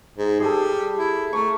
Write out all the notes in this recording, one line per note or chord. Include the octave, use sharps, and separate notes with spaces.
G#2
G3 G#4 A4
E4
A3 A#4 C#6